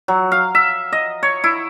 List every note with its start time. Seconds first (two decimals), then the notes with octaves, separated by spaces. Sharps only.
0.08 F#3
0.32 F5
0.55 E5
0.92 D#5
1.23 C#5
1.44 E4